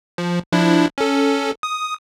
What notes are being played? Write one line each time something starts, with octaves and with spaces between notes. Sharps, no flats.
F3
F3 D4 E4
C#4 A4
D#6